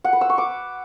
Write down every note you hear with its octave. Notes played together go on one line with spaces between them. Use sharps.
F#5
B4
E6
C#6
D6